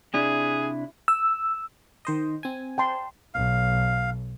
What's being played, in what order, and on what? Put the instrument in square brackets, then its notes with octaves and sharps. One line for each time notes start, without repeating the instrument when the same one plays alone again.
[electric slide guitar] C3 D4 E4 [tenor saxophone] G#4
[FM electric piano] E6
D#3 C5 D#5
C4 G#5
[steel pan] G5 A5 C6
[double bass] B1 [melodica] F5